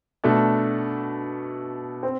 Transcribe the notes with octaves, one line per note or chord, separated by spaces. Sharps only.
B2 A3 D4 A4
C4